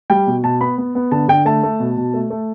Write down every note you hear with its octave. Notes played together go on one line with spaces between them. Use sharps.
G3 G5
B2
B2 A5
B3 B5
B3
B3
D3 A5
D3 G5
A3 A5
A3
B2
B2
A3
A3